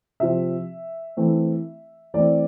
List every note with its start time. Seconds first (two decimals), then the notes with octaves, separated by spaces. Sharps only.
0.20 C3 F3 C4 E5
1.17 E3 A3 C4
2.14 E3 A3 C4 D5